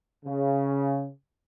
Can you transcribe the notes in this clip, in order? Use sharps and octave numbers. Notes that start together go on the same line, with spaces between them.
C#3